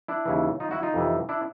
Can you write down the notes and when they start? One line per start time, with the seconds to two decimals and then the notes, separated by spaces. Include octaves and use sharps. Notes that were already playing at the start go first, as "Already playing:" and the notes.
0.08 D4 E4
0.25 D#2 C#3 E3
0.60 D#4 F4
0.71 E4 F#4
0.83 D#4 F4
0.94 F2 C3 E3
1.29 D4 E4